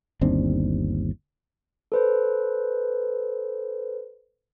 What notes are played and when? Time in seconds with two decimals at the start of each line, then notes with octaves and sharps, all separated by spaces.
0.21 G1 D#2 C4 D4
1.92 A4 B4 C5